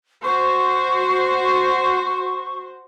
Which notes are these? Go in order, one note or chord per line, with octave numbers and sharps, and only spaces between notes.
F#4 C5 C#6